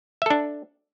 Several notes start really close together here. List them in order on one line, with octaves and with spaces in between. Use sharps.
E5 A4 D4